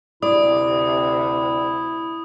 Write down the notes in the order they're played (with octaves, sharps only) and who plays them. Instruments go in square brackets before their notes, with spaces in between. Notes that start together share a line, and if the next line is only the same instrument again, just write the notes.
[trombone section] D2 C3 [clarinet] E4 [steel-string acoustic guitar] D5 [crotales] D#6